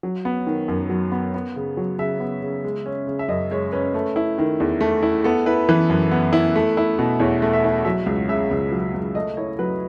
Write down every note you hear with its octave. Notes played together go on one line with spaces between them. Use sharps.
F#3
B3
D#3
F#2
F#3
B3
B3
C#3
F#3
C#3 E5
B3
C#3
G#3
C#4
C#3
E5
F#2 D#5
G#3 C#5
C#4 B4
A3
E4
D#3
E2
A3
E4
B3 A4
E4 B4
E3 B4
F#2
B3
E4
A3
E4
B2
E2 C#5
A3
E5
E4
F#3 E5
C#2
C#3 E5
C#2
F#3
C#2
A3 D#5
E4 C#5
F#3 B4